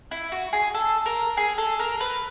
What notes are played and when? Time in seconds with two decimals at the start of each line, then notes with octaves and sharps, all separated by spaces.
0.11 E4
0.32 F#4
0.53 G#4
0.74 A4
1.06 A#4
1.37 G#4
1.58 A4
1.79 A#4
2.00 B4